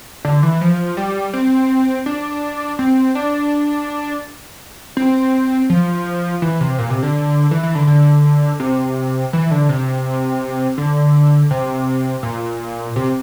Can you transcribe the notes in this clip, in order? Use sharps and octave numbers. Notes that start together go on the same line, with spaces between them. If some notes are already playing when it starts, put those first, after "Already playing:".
D3
E3
F3
G3
C4
D4
C4
D4
C4
F3
E3
C3
A#2
C3
D3
E3
E3
D3
D3
C3
E3
D3
C3
D3
C3
A#2
C3